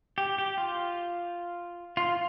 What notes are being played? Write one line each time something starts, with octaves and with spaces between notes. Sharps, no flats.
G4
G4
F4
F4